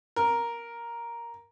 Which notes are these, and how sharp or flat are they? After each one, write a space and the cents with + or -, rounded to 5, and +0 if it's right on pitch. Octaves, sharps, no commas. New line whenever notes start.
A#4 +5